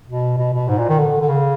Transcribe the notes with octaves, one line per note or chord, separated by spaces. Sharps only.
B2
B2
B2
G#2
A#2
D#3
D3
D3
C#3